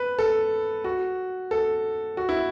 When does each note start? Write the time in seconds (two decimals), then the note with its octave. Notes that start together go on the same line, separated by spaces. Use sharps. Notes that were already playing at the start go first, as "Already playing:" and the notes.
Already playing: B4
0.19 A4
0.84 F#4
1.51 A4
2.17 F#4
2.29 E4